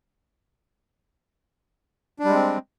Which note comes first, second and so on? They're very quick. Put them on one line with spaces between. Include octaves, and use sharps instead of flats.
D4 G3 G#3 C4